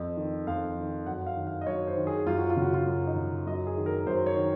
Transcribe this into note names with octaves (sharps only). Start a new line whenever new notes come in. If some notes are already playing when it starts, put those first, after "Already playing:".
Already playing: F2
D#3
F2 F5
D#3
F#2 F#5
F5
D#3
F5
D#5
F#2 C#5
C5
D#3
G#4
F#2 F4
F#4
F4
C#3
F#4
F4
F#2
D#4
C#3
F#2 D#5
G#4
D#3
A#4
F#2 C5
C#5
D#3